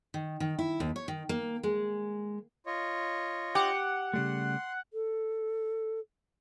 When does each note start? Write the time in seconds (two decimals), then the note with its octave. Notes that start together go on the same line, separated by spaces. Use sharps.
0.14 D#3
0.40 D#3
0.59 E4
0.80 D#2
0.96 C#5
1.08 D#3
1.29 A#3
1.63 G#3
2.66 F4 C#5 D#5
3.55 G4 F#5
4.14 C#3 G3 A3 C6
4.93 A4